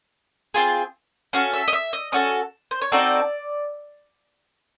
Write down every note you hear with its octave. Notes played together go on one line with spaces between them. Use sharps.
C4 F4 G#4
C#4 F#4 A4 F5
E5
D#5
E5
D#5
C#4 F#4 A4 D#5
C5
C#5
C4 D#4 F#4 A4 D5